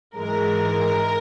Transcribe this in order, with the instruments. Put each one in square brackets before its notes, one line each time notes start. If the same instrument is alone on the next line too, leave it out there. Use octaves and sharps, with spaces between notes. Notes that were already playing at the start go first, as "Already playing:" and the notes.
[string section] G#2 E3 G#3 A#4